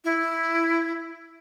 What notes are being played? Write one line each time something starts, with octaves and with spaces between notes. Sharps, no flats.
E4